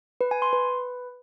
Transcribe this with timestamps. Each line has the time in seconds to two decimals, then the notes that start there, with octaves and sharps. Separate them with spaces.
0.21 B4
0.31 G#5
0.42 C6
0.53 B4